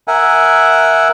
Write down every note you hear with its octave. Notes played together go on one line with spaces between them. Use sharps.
A#4 E5 F#5 G#5